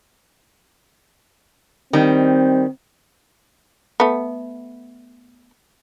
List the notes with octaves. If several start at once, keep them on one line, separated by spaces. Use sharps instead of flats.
D#3 G3 C4
A3 B3